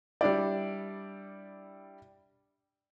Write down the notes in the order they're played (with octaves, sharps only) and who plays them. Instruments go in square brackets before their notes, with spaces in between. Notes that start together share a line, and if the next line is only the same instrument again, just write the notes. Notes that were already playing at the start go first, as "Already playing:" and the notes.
[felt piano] G3 D4 E4 D5